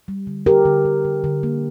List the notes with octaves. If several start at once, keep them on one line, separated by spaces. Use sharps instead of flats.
G3
D3
D3 G4 A#4
D3
D3
D3
D3
A#3